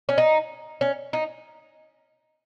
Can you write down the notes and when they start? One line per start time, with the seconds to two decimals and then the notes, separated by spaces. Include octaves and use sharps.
0.09 C#4
0.18 D#4
0.81 C#4
1.13 D#4